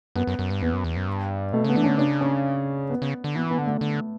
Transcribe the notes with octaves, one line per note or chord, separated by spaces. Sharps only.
F#2 B3
F#2
F#2
G2
E2 B3
F#2
E2
F#2
G2
B2 A3
C#3 B3
E3 D4
D3 C#4
C#3 D4
C#4
B3
C#3
D3
E3 B3
B3
D3
A3
D3